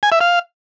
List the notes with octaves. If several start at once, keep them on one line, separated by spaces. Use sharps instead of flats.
G#5
E5
F5